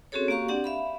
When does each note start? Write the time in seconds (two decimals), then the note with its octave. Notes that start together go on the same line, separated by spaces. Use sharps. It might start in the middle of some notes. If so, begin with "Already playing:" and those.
0.12 C4 C#4 F#4 G#4 A4 C#5
0.28 A#3 F#4 G4 F5 A#5 C#6
0.48 C4 D4 G4 D5 F#5
0.64 E5 F5 B5